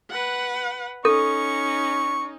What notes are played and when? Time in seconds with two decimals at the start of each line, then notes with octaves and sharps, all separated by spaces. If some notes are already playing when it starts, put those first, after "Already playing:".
0.11 B4 F#5
1.05 C#4 D#4 A4 C#6